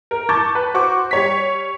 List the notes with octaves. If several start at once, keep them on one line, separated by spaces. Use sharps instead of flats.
A#4
A5 C#6 D6 G6 A6
B4
F#4 C5 C#6 D6
G3 C#5 B6